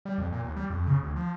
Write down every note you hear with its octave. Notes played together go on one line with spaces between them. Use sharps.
G3
F2
A#2
D#2
G3
F2
C#3
D2
F3